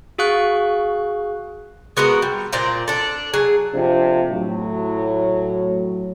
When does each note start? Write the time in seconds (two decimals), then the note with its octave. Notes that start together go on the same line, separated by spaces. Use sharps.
0.18 F#4 G#4 F5 C#6 F#6
1.97 G#3 B3 F#4 A#4
2.22 G3
2.52 A#2 C4 D5 A#5
2.88 D4 A4
3.34 F#3 G#4
3.74 F2 C3 D4 F4
4.31 A2 F#3